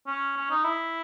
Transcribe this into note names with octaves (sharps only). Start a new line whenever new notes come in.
C#4
C#4
D#4
E4